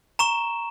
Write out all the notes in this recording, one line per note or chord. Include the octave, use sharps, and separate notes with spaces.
A#5 C#6 E7